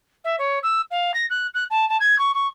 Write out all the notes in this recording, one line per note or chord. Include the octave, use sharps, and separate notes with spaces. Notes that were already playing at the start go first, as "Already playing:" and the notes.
E5
C#5
E6
F5
A#6
F#6
F#6
A5
A5
G#6
C#6
C#6